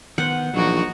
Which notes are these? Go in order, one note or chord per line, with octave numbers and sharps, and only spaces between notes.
D#3 B3 C5 F#5
A#1 E3 F#3 D#4 F#4